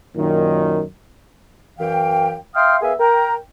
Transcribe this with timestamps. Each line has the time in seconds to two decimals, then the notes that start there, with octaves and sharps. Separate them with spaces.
0.16 F#2 A#2 D#3
1.78 F#2 E3 F5 G5
2.55 E5 F5 G5 C6 D#6 F6
2.82 B3 G#4 A#4 E5 F5 G#5
3.00 A#4 G5 A#5